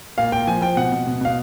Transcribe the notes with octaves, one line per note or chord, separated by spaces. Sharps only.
A#2 F5
A#2 G5
F3 G#5
F3 G5
B2 F#5
B2
B2
B2 F5